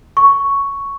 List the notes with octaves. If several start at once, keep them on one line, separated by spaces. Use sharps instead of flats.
C#6